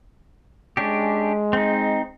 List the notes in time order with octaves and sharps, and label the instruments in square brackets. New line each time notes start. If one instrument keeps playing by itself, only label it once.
[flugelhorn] G#3 [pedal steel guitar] C#4 D4 G4
[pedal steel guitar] C4 D#4